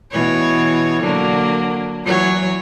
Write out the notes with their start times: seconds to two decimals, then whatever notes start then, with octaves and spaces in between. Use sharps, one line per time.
0.12 B2 E3 C#5
1.02 D3 F#3 A#3
2.03 E3 F#3 C#5